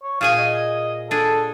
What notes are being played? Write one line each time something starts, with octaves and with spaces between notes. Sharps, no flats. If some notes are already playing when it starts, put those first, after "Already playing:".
C#5
A#2 G#4 F5 G#5
D#5
D4 G#4 A4